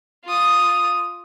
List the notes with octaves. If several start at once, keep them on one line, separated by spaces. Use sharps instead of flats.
F4 D#6